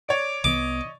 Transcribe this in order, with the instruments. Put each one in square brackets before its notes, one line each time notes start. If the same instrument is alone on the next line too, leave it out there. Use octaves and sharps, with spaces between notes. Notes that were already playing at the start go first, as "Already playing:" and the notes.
[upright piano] C#5 D5 [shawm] D6
[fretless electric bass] C2 G#3 B3 [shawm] D#5 [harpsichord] D6